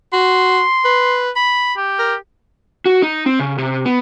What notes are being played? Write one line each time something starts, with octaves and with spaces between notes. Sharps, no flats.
F#4 C6
B4
B5
G4
A#4
F#4
D#4
C4
C#3
C3
B3